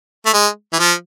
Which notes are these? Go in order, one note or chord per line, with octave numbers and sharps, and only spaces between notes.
A3
G#3
E3
F3